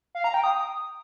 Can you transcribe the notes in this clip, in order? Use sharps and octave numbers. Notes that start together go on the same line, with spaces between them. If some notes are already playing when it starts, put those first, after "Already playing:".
F5
A#5
G5
D#6